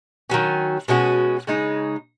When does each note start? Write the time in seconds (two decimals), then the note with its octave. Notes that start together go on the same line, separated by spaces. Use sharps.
0.30 D#3 F#3 C#4
0.88 B2 G#3 C#4 F#4
1.47 C#3 G#3 D#4